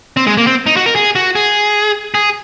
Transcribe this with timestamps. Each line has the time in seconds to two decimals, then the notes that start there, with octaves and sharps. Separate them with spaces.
0.17 C4
0.27 G#3
0.37 A#3
0.47 C4
0.67 D#4
0.77 F#4
0.86 A#4
0.95 G#4
1.15 F#4
1.35 G#4
2.14 G#4